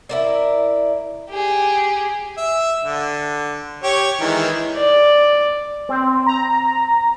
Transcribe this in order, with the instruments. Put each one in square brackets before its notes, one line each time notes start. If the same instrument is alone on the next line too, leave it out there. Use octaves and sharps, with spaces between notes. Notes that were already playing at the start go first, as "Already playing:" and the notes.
[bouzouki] E4 A#4 D5
[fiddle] G4 G#4
[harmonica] E5
D3
G4 C#5
D#3 E3 G#3
[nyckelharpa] D5
[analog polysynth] C4
A#5